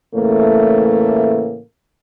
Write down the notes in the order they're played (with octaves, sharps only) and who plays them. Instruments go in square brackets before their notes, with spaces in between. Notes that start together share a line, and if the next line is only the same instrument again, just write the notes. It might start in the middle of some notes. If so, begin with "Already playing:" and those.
[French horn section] A2 C#3 E3 A3 A#3